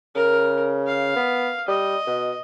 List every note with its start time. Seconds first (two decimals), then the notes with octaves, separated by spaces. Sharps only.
0.15 C#3 A#4
0.86 F5
1.16 B3
1.68 G3 D#5
2.07 B2